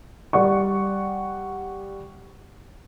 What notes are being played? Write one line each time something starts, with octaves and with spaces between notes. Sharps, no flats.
G3 D5 F#5 C#6